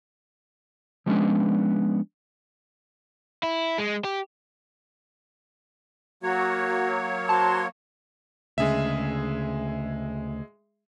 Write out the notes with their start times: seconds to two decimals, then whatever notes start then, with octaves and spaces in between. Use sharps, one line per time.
1.06 F3 G3 G#3 B3 C#4 D4
3.43 E4
3.78 G#3
4.04 G4
6.23 F#3 A#3 F#4 C#5
7.29 F#4 C5 A5 C6
8.58 D2 C#3 G#3 G#4 E5